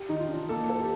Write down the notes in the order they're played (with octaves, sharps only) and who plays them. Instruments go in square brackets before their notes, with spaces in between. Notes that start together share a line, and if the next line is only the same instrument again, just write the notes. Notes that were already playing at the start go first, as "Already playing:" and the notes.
Already playing: [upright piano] G4
[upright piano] D#3 [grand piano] D#4
[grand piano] F4
[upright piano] D4
[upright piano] A#3 [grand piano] A4
[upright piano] A4
[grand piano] G4